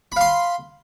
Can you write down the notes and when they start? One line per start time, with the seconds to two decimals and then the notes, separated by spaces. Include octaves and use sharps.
0.12 B5
0.16 F5
0.21 C6